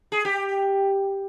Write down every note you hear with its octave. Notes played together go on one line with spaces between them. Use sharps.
G#4
G4